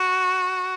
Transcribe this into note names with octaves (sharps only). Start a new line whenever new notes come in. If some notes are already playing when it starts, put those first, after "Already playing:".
Already playing: F#4